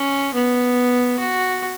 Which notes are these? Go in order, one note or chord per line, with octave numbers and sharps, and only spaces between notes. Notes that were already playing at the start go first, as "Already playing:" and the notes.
Already playing: C#4
B3
F#4